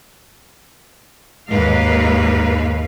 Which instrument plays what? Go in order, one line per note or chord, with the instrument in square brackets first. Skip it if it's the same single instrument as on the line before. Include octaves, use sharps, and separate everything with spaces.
[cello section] D#2 G#2 A#3 B4 F5